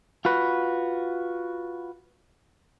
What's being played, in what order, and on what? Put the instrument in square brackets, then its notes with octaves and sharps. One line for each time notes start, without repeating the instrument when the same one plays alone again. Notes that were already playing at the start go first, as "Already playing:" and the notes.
[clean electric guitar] F4 F#4 B4